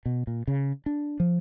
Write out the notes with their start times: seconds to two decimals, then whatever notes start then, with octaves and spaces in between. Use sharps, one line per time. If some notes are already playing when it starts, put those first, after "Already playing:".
0.06 B2
0.27 A#2
0.47 C#3
0.86 D4
1.20 F3